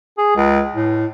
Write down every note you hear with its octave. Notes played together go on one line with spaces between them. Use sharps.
G#4
C#2
A2